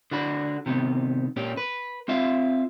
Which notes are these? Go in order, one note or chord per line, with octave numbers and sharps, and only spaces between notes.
D3 D4 F#4 B5
C3 D#3 B3
A#2 C#4 G4
B4
C4 F4 E5 F5